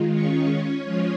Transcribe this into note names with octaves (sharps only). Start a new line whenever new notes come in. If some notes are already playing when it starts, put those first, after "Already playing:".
Already playing: D#3 G#3 F4
C#4 C#5
F3 G#3 C#4 F4